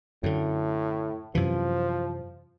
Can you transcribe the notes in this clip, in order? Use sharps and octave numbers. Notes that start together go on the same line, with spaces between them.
F#2 A2 D3
F#2 C3 E3 F3